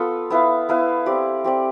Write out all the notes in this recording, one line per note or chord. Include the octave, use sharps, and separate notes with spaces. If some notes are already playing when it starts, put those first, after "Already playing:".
Already playing: B3 F4 A4
B3 E4 B4 F5
B3 E4 B4 F5
C4 G4 D5
C4 G4 D5